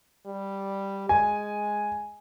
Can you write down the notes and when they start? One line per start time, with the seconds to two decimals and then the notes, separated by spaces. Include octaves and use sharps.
0.26 G3
1.09 G#3 G#5